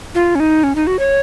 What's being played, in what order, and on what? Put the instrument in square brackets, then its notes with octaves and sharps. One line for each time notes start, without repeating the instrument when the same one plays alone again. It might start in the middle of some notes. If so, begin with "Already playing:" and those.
[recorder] F4
C#4
D#4
C#4
D#4
F#4
C#5